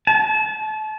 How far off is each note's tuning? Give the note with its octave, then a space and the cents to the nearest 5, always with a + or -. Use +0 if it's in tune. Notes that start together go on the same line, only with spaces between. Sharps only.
A5 -30